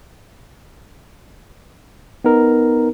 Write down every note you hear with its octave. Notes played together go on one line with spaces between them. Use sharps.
B3 D#4 A#4